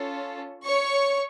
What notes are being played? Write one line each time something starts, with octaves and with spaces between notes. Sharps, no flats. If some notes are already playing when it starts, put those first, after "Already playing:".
Already playing: C#4 F4 A4
C#5 C#6